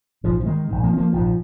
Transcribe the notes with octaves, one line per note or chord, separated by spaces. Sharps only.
A#1 G#2 F3
F3
D#3 G#3
A#1 G#2
F3 A#3
C4
F3 A#3
A#1 G#2 F3